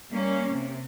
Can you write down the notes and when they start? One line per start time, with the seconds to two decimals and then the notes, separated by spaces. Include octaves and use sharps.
0.11 G3 A#3 C#4
0.50 C3